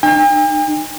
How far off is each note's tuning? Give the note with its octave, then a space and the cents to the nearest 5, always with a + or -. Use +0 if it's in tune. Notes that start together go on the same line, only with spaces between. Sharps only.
D#4 -30 G5 +45